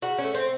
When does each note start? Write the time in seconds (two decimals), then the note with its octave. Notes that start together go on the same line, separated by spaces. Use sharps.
0.02 C#3 F#4
0.18 C#4
0.24 A3
0.35 C4